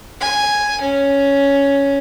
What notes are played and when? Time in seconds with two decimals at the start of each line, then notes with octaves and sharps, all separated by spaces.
0.20 G#5
0.81 C#4